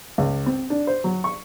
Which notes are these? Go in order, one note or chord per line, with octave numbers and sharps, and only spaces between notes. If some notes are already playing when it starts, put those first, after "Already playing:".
C#2
C4
D4
C5
F#3
C#6